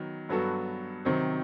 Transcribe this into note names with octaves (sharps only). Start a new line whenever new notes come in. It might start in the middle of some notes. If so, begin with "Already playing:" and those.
Already playing: D#3 F#3 B3
G2 F#3 B3 F#4 A4
C3 D#3 F#3 C4